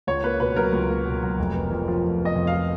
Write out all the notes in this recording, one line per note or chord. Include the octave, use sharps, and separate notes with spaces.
C#2 C#5
A#3 B4
B2 B4
F#3 A#4
C#2
A#3
B2
F#3
F1
B3
F2
F3
F1
B3
D#5
F2
F5
F3